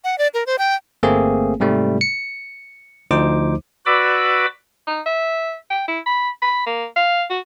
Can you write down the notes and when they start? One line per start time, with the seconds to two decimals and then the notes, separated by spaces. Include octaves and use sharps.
0.04 F#5
0.18 D5
0.34 A#4
0.46 C5
0.59 G5
1.03 G1 A3 A#3 C4 G#4
1.60 G#2 C3 G3 A3
2.01 C#7
3.11 D2 F3 D#4 C5 D6
3.86 F#4 B4 D5 B5 D6 E6
4.87 D#4
5.06 E5
5.70 G5
5.88 E4
6.06 B5
6.42 B5
6.66 A#3
6.96 F5
7.30 F#4